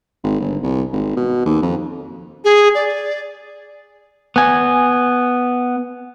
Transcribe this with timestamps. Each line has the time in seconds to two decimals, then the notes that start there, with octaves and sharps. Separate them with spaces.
0.24 G#1
0.40 G1
0.63 C2
0.93 G#1
1.17 B2
1.46 D#2
1.62 F2
2.44 G#4
2.75 D5
4.36 B3 G#5